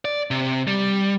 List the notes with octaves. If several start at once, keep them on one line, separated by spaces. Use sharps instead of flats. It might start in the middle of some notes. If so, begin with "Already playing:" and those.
D5
C3
G3